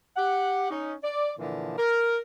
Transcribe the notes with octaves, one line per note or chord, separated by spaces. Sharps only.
G4 F#5
C#4 D#4
D5
A#2 D3 E3 F3
A#4